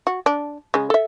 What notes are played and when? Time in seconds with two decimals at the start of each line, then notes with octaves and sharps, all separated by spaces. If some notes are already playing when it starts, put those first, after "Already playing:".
0.07 F#4
0.26 D4
0.74 C#3 G#3
0.90 A4 E5